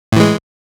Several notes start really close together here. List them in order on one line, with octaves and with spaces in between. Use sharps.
A2 E3 G#3